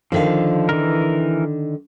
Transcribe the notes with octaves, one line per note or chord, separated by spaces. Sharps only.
D3 D#3 F3 F5
E3 A#4